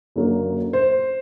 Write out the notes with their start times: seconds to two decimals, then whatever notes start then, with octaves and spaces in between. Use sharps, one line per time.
0.16 F#1 F#2 D3 F#3 A#3
0.73 C5